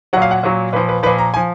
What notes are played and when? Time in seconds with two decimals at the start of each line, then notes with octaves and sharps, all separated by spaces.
0.13 A#2 F#3 F#5
0.22 F5
0.31 F#5
0.43 A#2 F#3
0.73 A#2 B4
0.76 F3
0.89 B4
1.03 F3 B4
1.06 A#2
1.18 A#5
1.34 F3 G#5